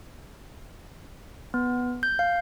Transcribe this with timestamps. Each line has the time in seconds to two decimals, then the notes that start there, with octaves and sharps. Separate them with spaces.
1.54 B3
2.03 G6
2.19 F5